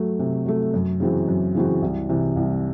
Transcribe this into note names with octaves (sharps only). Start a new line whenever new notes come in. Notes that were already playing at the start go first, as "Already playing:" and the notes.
Already playing: F#3 A3
C3
F#3 A3
F#2
C#3 E3 C4 F#4
F#2
C#3 E3 C4 F#4
C2
C3 E3
C2